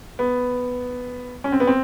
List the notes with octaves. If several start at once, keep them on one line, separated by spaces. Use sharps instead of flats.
B3
C#4
C4
B3
C4